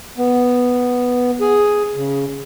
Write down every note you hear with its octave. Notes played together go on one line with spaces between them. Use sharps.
B3
G#4
C#3